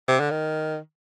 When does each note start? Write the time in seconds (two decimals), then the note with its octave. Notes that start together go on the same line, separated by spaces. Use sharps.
0.08 C3
0.20 D3
0.31 D#3